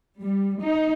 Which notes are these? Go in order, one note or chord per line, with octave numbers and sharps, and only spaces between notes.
G3
D#4